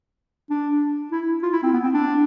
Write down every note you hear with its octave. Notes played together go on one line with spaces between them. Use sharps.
D4
E4
F4
E4
C4
B3
C4
D4